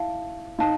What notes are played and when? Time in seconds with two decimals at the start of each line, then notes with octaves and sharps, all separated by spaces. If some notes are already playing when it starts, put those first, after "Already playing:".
Already playing: E4 F5 A5
0.59 D#4 F5 A5